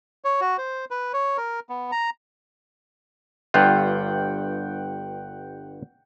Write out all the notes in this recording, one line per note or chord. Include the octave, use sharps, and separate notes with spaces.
C#5
F#4
C5
B4
C#5
A#4
B3
A#5
G1 G2 F4 F#5 G5